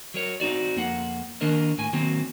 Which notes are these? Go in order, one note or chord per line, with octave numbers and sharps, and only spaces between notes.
F#3 A#4 C#5
C4 D#4 F#4 D5
F2 A#3 F#5
D#3 A#3 D4 A#4 D#5
A2 G#5
D#3 F#3 A#3 C4